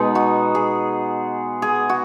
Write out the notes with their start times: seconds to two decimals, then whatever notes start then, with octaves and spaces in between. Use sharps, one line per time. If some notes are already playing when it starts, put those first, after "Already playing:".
Already playing: B2 G#3 B3 D#4
0.15 F#4
0.55 G#4
1.62 G#4
1.89 F#4